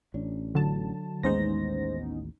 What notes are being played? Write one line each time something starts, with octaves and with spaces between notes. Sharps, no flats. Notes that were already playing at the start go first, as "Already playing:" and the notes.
A1 C#4 D4
D3 F#3 A5
A1 D#2 G#3 B3 C#4 D#4 C5 A#6